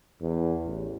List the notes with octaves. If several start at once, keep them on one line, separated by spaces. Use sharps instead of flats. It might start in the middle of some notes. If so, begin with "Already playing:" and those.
E2
A1